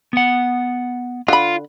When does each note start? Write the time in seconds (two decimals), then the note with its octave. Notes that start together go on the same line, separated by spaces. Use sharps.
0.13 B3 F#5
1.28 D3 F4 B5